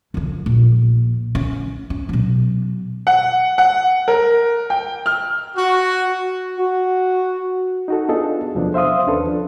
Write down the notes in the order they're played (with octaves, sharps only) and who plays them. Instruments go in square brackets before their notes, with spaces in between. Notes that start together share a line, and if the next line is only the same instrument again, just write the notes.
[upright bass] F2 C#3
A#1
C#4
C#4
B2 F#3
[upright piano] F#5
F#5
A#4
G5
F6
[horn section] F#4
[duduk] F#4
[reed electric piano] D#4 F#4 A4
B3 D4 F4 G#4 A4 D#5
E2 C3 F3 F#3 B3 D4
C5 E5 F5 C6 D#6
D#2 C#4 D4 A4 B4
F3 D4